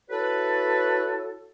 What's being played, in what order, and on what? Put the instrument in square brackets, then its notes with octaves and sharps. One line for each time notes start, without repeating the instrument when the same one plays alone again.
[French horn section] E4 F#4 C#5 [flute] A4 [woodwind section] B4